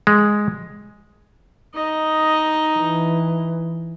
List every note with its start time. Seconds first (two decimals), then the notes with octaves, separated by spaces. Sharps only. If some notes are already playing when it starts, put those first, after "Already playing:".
0.07 G#3
1.74 D#4 D#5
2.77 E3